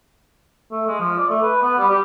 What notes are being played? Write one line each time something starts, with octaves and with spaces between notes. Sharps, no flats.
A3
G#3
F3
D5
A3
B4
B3
G3
G4